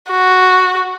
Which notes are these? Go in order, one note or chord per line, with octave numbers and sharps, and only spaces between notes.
F#4